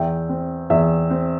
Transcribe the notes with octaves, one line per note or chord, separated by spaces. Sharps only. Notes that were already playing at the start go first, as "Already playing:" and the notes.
Already playing: E2 E5 G5
C4
E2 E5
C4